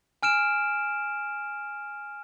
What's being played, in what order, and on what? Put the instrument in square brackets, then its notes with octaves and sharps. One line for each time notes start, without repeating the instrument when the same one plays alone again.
[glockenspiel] G#5 F6 D7 E7